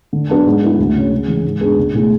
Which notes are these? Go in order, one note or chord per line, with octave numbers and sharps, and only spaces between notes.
D3
F#3 B3 D4
G#2
F#3 B3 E4
D2
C#3 G#3 C#4
C#3
E3 G#3
G#2
G#3 B3 D4 G#4
C#2
B2 A3 E4 G#4